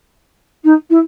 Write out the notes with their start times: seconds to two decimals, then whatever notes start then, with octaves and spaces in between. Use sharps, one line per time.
0.64 D#4
0.90 E4